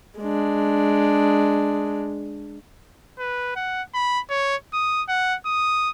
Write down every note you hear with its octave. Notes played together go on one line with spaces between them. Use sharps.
G#3 D4
B4
F#5
B5
C#5
D#6
F#5
D#6